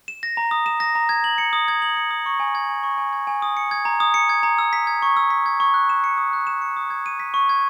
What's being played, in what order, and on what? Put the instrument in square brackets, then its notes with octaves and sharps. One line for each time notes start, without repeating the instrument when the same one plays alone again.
[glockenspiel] E7
A#6
A#5
D#6
E7
A#6
A#5
G#6
F#7
C#7
D#6
G#6
F#7
C#7
D#6
C#6
G#5
G#6
G#5
C#6
G#5
G#6
G#5
D#6
C#7
G#6
A#5
D#6
C#7
G#6
A#5
E6
B6
G#6
C#6
E6
B6
G#6
C#6
F#6
E7
C#7
D#6
F#6
E7
C#7
D#6
G#6
D#7
B6
C#6
G#6